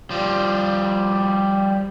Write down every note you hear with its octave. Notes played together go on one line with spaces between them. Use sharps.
F3 G3